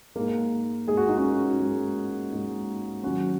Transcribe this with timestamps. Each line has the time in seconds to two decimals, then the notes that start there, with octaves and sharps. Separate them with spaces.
0.16 G#2 G#3 A#3
0.87 G#2 G#3 G#4
0.97 F#4
1.08 D#4
1.18 C#4 F#4
1.59 G#2 G#3
2.32 G#2 G#3
3.03 G#2 D#3 F#3 C#4 F#4